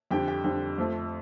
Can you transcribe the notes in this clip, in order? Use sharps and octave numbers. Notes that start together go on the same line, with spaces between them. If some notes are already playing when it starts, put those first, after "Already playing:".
F2 D3 G3 G4 G5
G4 G5
F2 D3 G3
F2 F3 A3